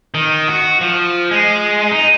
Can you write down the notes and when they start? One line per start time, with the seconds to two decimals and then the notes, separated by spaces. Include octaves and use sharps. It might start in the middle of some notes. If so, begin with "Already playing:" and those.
0.14 D#3
0.48 F#4
0.81 F3
1.31 G#3
1.92 D#4